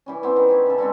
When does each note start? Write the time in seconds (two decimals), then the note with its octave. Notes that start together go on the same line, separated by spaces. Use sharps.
0.06 E3 G3 C#4
0.23 E3 B3 C4
0.36 D#3
0.49 G4 C#5
0.66 C#3 A4
0.78 G#3 C4 D4 A4